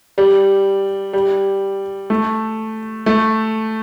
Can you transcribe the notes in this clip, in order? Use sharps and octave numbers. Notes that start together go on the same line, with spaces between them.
G3
G3
A3
A3